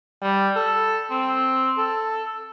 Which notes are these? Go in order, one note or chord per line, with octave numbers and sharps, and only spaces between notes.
G3
A4
C4
A4